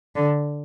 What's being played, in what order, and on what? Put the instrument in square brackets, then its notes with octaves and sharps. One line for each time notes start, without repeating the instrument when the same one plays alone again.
[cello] D3